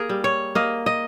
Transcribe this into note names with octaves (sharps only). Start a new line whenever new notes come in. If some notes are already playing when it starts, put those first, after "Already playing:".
Already playing: A#3 G#4 A#4
G3
C#5
A#3 D#5
D#5